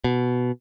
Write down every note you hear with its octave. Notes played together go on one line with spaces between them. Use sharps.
B2